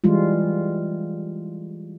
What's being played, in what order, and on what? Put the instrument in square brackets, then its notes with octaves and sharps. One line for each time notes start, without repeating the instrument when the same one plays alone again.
[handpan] E3 G3 G#3 F4